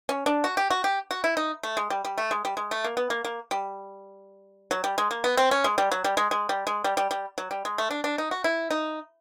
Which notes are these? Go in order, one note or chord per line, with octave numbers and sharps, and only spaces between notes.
C#4
D4
F#4
G4
F#4
G4
F#4
E4
D#4
A3
G#3
G3
G3
A3
G#3
G3
G#3
A3
A#3
B3
A#3
A#3
G3
F#3
G3
G#3
A#3
B3
C4
C#4
G#3
G3
F#3
G3
G#3
G#3
G3
G#3
G3
G3
G3
F#3
G3
G#3
A3
D4
D4
D#4
F#4
E4
D#4